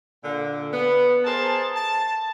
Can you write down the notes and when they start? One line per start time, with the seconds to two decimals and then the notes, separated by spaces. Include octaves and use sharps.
0.24 A#2 D3
0.72 B3
1.25 G#4 A#4 C5 A5
1.76 A5